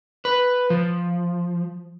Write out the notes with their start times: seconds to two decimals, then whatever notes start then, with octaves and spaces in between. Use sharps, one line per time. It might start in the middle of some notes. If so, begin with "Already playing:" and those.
0.25 B4
0.70 F3